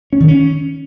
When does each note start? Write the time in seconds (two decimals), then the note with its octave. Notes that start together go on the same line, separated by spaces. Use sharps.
0.13 C#4
0.20 D#3
0.28 C#4